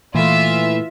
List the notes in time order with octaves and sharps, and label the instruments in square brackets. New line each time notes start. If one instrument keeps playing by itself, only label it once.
[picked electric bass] A#2 A3 [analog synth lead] E3 [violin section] F4 E5